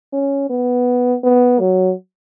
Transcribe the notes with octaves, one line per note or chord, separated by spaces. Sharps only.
C#4
B3
B3
F#3